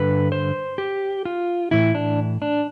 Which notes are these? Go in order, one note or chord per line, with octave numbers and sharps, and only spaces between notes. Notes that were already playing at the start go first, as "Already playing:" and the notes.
Already playing: G2 D3 B4
C5
G4
F4
A2 E3 E4
D4
D4